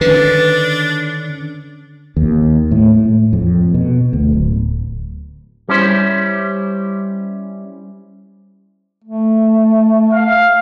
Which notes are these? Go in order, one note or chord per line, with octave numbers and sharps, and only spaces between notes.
D3 D#3 C#4 D4 B4
D#2
A2
A2
F2
B2
D2
D1
G3 C#4 E4 C5
A3
F5